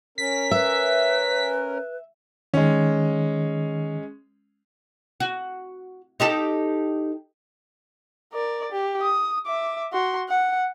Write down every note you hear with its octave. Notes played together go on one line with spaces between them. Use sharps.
C#4 A#4 B6
B4 E5
D#3 G#3 C#4
F#4
D#4 G4 A4
A#4 D5
G4
D#6
E5 D6
F#4 C6
F#5